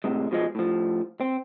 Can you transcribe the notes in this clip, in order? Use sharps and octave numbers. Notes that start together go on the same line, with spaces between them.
A2 C3 G#3
B2 F3 G#3
A2 F3
C4